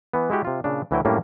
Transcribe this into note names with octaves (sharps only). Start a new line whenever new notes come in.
E3 B3
G#3 E4 F#4 G4
C3 F4
A#2 C#3 D4
D2 E3 F#3 E4 F#4 G5
F#2 A2 G3 A#3 C#4 D4